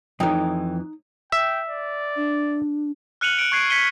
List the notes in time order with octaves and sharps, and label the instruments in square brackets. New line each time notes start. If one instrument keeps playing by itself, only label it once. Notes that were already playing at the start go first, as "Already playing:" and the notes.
[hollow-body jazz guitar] F2 E3 [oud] D#4 [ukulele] A4 C#5 G5
[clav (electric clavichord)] E5 [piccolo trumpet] G5
[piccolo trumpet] D5
[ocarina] D4
[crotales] F6 F#6 C#7 D#7 F7 F#7
F#6 D7
C#6 F#6 G#6 C7 D7
G#6 B6 C#7 D#7 G7